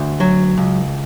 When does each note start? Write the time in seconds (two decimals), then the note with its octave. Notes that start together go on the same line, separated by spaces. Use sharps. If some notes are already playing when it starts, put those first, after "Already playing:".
Already playing: D2
0.20 F#3
0.58 C#2